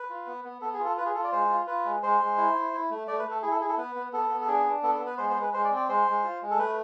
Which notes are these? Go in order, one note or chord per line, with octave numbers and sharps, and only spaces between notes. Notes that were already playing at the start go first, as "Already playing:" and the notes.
Already playing: B4
F4
B3
B3
B3 A4
G#4
F4
A4
F4 B4
G#4
F4 A4
D5
G#3 C5
F4
F4 B4
G#3
G#3 C5
G#3
E4
E4
E4
A3
A3 D5
B4
A3
A4
E4 G#4
A4
E4 G#4
A4
B3 B4
B3
B3 A4
B3
A4
D4 G#4
D4
B3 A4
A4
B3
B4
G#3 C5
C5
G#3
B4
G#3 C5
D5
C4
D5
G#3 C5
G#3
F4
G#3
A4
A3 B4